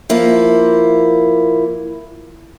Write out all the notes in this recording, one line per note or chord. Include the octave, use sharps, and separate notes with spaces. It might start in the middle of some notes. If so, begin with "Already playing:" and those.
F3 A#3 E4